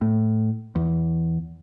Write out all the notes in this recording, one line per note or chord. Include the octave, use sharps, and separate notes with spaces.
A2
E2